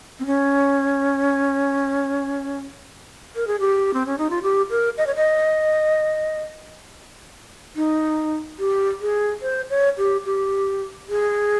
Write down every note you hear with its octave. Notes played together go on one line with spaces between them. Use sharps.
C4
C#4
A#4
G#4
G4
C4
C#4
D#4
F4
G4
A#4
D#5
C#5
D#5
D#4
G4
G#4
C5
C#5
G4
G4
G#4